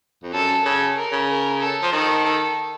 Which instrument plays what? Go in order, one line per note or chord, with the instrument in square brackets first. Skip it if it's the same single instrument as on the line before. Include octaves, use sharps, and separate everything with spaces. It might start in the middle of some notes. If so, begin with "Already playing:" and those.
[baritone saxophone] F2
[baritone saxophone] F#2 [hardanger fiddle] A4
[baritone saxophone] C#3 [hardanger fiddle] A4
[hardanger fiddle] A#4
[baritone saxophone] C#3
[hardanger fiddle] A#4
A4
[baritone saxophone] F3
[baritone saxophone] D#3 [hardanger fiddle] A4
[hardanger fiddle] A4